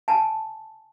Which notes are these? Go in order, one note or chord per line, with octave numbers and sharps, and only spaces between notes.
G#5 A5